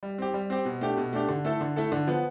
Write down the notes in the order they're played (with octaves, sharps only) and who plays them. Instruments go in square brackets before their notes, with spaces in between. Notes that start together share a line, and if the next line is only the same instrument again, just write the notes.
[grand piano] G3
C4 G4
G3
C4 G4
B2
A3 D4 G4
B2
A3 D4 G4
D3
A3 E4 A4
D3
A3 E4 A4
D3
F3 B3